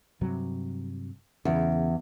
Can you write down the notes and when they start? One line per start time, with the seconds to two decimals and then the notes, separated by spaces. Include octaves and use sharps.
0.21 G2 C3 F#3
1.45 E2 C#3